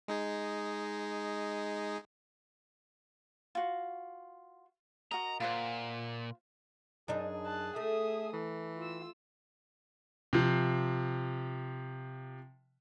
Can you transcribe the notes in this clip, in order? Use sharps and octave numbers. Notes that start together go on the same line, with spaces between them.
G#3 D#4 G#4
F4 F#4
F#4 A#4 D#5 A#5
A#2 F4 C5 F#5
F#2 D4 D#4 G#4
A5 F#6
A3 E5 D#6
E3 A4
F4 E6
C3 F3